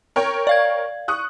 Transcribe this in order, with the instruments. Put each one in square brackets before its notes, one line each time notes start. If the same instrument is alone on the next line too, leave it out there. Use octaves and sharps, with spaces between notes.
[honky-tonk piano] A#4 C#5 G5
[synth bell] D5 F5 G#6
[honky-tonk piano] C#6 D#6 F#6